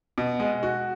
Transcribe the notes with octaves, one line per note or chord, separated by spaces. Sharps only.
B2
G#3
F#4